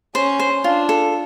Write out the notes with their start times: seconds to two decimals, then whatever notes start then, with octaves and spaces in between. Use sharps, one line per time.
0.15 C#4 C5
0.40 C5
0.64 D4 F4
0.89 A4